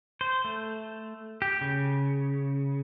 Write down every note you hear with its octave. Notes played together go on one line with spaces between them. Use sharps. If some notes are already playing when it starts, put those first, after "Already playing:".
C5
A3
G4
C#3